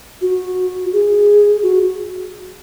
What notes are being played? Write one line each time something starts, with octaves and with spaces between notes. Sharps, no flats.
F#4
G#4
F#4